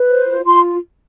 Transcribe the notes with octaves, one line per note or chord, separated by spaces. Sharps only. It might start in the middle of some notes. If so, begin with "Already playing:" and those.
Already playing: B4
C5
F4
F4 C6